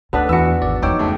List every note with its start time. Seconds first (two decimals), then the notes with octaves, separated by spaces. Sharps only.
0.13 D2 B3 D4 A4 B4
0.29 E2 E3 F#4 E6 C#7
0.61 G#1 D5
0.83 F2 F3 D#4 C#5 G5 D6 E6
0.99 C#2 A3